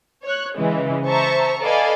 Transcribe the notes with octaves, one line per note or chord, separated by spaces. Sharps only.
C#5 F#6
C#3 E3 G#3
C5 E5 A5 A#5 C#6
A4 B4 D5 D#5 F5 G#5